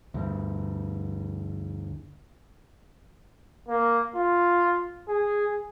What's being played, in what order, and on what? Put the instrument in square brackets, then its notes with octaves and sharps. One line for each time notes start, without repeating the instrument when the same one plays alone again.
[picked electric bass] D2 G2
[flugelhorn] A#3
F4
G#4